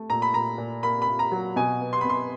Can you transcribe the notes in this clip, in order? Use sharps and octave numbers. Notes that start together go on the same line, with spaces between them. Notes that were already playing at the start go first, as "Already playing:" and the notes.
Already playing: A3
A#2 A#5
B5
A#2 A#5
A#2
A#3 B5
B5
A#2
A#5
F#3
B2 G#5
B3
C6
B5
B2 C6